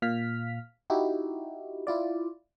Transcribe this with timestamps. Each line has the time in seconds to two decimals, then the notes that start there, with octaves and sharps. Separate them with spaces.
0.02 A#2 F5 F6 B6
0.90 D#4 E4 F#4 G4
1.87 E4 F4 D5